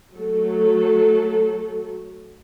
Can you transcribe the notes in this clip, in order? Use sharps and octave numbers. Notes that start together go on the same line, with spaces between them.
F#3 A3 A4